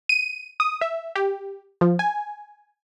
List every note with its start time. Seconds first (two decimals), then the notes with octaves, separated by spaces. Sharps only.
0.09 D#7
0.60 D#6
0.81 E5
1.15 G4
1.81 F3
1.99 G#5